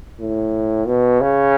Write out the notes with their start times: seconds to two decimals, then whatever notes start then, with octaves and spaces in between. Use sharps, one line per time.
0.20 A2
0.87 B2
1.21 C#3